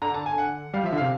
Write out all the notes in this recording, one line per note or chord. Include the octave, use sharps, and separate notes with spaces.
D3 A#5
A5
G#5
F#5
G3 F5
F3 E5
D3
C3 F5